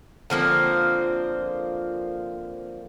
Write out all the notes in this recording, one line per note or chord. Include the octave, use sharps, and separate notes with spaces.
D3 F3 A#3 C4